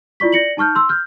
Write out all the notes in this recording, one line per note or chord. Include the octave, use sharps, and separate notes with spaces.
E4 F4 D5 C#6 B6
D5 A#6 C#7 F#7
D#4 A5 C#6 F6 G6
C6 E6
F6 G6